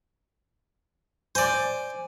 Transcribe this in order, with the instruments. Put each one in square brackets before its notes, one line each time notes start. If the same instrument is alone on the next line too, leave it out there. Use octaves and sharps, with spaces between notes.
[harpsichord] C5 D5 [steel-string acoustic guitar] G#5